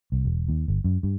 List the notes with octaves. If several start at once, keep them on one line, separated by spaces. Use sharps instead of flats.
C2
E1
D#2
G1
F#2
G2